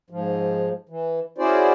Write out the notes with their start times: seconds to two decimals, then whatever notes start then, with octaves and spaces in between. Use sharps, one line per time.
0.10 G#2 F3
0.89 E3
1.38 C#4 E4 F#4 G#4 C5 D5